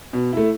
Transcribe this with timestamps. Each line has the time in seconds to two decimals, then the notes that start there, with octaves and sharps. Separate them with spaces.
0.13 B2
0.33 A3 E4